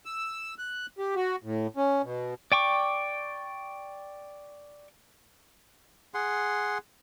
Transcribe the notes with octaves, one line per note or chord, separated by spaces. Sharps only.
E6
F#6
G4
F#4
A2
C#4
B2
D5 G5 C#6 D6
G#4 F#5 C6